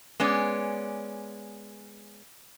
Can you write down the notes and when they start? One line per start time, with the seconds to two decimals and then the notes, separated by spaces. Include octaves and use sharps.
0.20 G#3 B3 C#4 D5